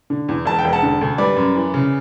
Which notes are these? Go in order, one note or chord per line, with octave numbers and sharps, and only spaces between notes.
D3
E2
E1 A5
G5
E1
F#5 A5
D3
D2
G3 B4 D5
F#2
E3
C#3